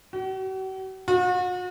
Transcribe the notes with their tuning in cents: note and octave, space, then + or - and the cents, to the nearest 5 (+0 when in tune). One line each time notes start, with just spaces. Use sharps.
F#4 +45
F#4 -40